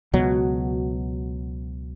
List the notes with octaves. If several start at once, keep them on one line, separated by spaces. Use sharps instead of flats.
C#2 B2 F#3